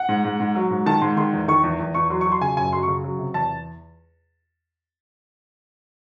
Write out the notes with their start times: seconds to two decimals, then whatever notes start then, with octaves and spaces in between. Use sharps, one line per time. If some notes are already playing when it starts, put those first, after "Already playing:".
Already playing: F#5
0.09 G#2
0.25 G#2
0.40 G#2
0.55 F#3
0.70 G#2
0.86 D#3 A5
1.01 G#2 C6
1.17 D#3 C6
1.33 E2
1.48 D#3 C#6
1.63 E2
1.80 E2
1.94 E2 C#6
2.10 F#3 C6
2.21 C#6
2.26 F#3
2.32 C6
2.41 C#3 G#5
2.57 F#2 G#5
2.72 F#3 C6
2.83 C#6
2.88 C#3
3.04 F#3
3.19 C3
3.34 E2 A5